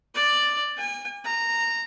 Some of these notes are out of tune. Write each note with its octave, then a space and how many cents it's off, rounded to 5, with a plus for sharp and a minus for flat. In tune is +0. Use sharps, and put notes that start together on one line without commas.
D5 +5
G#5 -40
A#5 -15